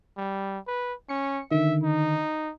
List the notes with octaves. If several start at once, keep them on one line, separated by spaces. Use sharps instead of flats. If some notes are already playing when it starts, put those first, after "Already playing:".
G3
B4
C#4 C#7
D3 D#3 E5
D#4